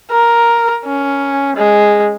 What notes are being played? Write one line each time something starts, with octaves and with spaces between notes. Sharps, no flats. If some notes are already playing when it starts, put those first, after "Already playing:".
A#4
C#4
G#3